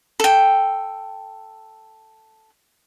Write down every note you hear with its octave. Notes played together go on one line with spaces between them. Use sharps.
A4 G5